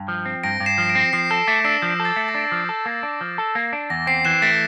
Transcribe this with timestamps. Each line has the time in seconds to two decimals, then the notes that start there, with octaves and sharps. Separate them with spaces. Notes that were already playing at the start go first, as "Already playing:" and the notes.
Already playing: G2
0.08 F3
0.26 C4
0.43 G2 A#6 D7
0.60 G2
0.66 C7 E7
0.78 F3
0.89 A#6 D7
0.95 C4
1.13 F3 C7
1.30 A4 C7
1.47 A3 D6
1.65 D4 E6
1.82 F3 G6
2.00 A4
2.05 A6
2.16 A3
2.28 A#6
2.35 D4
2.52 F3
2.69 A4
2.86 A#3
3.03 D4
3.21 F3
3.38 A4
3.55 A#3
3.73 D4
3.90 E2 A#6
4.07 C4 C7
4.25 E3 C7 E7
4.42 A3 A#6 D7